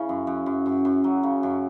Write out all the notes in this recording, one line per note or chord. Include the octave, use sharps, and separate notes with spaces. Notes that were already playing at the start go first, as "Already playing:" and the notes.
Already playing: C#3 C#4 E4
F#2
F#2
F#2
F#2
F#2
F#3
C#3
F#2